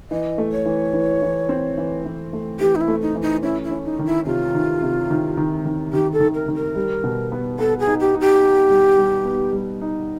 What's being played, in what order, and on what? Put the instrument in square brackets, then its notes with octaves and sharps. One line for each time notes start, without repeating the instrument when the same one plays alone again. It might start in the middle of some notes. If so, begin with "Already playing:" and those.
[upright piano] E3 [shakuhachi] D#5
[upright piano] A3
[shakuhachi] C#5
[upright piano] E3
E3
E3
C4
E3
E3
A3
[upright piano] E3 [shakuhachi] G4
[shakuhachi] D#4
E4
[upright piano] A3
[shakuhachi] D#4
[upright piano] E3
[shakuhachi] D#4
[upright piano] C#4 [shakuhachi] E4
[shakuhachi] E4
[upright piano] C#4
[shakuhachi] D#4
[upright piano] D#3
[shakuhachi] E4
[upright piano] C3 [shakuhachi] F4
[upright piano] D#3
C3
D#3
D#3
D#3
[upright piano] D#3 [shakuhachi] G4
[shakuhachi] A4
[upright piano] D#3
[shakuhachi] A#4
[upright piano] D#3
[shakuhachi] A#4
[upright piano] G3
B2
B3
[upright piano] B3 [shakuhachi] A4
[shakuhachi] G#4
[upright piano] D#4
[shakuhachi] G4
[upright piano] D#4
[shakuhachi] G4
[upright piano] D#4
G3
G3
B3
G3
D#4